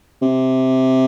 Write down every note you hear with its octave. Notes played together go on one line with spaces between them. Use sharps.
C3